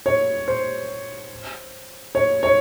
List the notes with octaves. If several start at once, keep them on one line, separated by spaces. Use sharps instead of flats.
C#5
C5
C#5
C#5